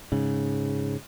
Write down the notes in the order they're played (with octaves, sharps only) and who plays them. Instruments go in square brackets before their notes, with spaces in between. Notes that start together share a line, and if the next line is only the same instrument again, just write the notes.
[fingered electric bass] G#2 C#3